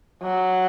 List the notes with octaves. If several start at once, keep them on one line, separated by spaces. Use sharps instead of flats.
F#3